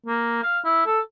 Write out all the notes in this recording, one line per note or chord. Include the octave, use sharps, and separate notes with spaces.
A#3
F5
E4
A4